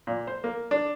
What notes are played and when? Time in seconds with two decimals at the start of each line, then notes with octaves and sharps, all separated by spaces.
0.07 A#2
0.27 C5
0.44 A#3
0.71 D4